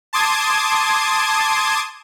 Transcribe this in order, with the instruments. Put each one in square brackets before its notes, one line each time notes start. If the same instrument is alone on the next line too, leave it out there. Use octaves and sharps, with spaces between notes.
[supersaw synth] A5 C6 D6 D#6 G#6